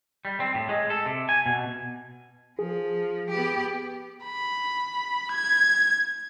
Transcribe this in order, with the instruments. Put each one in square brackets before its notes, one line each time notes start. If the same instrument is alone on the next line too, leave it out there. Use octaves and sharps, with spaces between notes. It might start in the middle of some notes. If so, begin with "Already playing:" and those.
[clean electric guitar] G3
C4
A2
G#3
A4
C3
G#5
B2
[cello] F3 [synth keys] G#4
[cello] B3 G4
[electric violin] B5
G#6